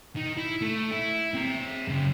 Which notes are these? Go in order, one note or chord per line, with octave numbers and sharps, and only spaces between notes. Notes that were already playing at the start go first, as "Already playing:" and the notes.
D#3
E4
A3
E4
C4 A#5
F#2 C#3